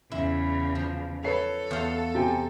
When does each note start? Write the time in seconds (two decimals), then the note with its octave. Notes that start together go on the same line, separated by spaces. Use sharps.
0.12 E2 C#3 E4
0.75 F3
1.24 A4 B4 C#5 C7
1.71 E2 F5
2.15 C3 G5 G#5